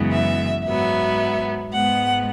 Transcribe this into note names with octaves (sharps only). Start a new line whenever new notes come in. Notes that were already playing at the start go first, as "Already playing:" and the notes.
Already playing: F#2 C#3 E3 G#3 B3
E5
G#2 F#3 B3 E5
G#2 G#3 B3 F#5